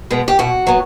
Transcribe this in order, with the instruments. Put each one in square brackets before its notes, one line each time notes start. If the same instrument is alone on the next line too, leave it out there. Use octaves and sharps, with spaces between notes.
[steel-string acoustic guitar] B2 G#3 B3
G4
B2 F#4
F#3 B3